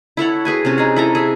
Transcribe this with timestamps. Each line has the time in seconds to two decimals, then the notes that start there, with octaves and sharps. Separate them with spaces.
0.17 E4 A4 C#5 F#5
0.45 F#4 G#4 B4 G#5
0.65 C3 C#4
0.78 D#4 G#4
0.96 E4 A4 A#5
1.15 G#4 E5